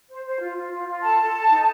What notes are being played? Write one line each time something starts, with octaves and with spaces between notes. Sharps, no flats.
C5
C5
F4
F4
F4
F4
A4 A5
A4
A4
D#4